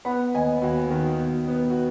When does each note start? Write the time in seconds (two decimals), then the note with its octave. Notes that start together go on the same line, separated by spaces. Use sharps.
0.05 B3 F#5 B5
0.34 D#2 D#5 G#5
0.62 D#2 F#4
0.90 D#3
1.19 B2
1.48 B3
1.70 F#4